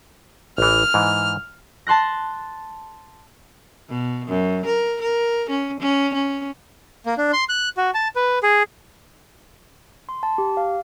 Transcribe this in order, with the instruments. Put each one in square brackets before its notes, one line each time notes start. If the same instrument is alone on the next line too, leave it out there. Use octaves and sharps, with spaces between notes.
[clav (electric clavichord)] A1 E3 [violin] F6
[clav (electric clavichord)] G#2 E3
[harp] A5 C6 F#6 A#6
[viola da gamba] B2
F#2
A#4
A#4
C#4
C#4
C#4
[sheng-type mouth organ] A#3
D4
C6
F#6
F#4
A5
B4
G#4
[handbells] C6
A5
G4
F5